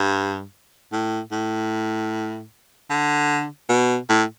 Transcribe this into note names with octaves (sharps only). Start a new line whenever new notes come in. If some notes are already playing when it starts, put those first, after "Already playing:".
Already playing: G2
A2
A2
D3
B2
A2